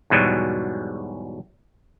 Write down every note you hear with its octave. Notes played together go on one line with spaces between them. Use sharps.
E2 G#2 B2 F#3 G3